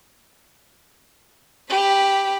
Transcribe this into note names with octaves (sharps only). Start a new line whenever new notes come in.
G4 B5